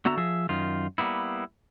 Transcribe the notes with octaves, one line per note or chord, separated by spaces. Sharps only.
D3 B3 F#4 E5 A#5
F3 G#4 E5
F#2 D#3 F4
G3 A#3 B3 E4